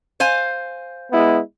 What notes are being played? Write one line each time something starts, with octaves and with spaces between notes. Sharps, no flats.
C5 F5 G#5
G#3 B3 E4